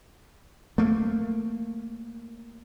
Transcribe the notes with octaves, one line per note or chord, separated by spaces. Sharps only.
A3 A#3